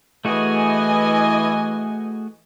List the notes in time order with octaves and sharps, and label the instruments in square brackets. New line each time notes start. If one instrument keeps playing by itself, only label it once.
[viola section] E3 D#5 G#5 [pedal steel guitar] A3 F#4 G#4